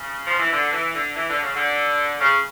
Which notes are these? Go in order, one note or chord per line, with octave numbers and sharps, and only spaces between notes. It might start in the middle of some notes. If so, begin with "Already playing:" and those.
Already playing: C#3
F3
E3
D3
E3
D3
E3
D3
C#3
D3
C#3